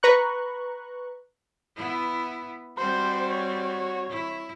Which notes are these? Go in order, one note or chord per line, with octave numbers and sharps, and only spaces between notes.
B4 A#5 C#6 F#6
B3 E4
G3 C4 F#4 C5
C#5
E4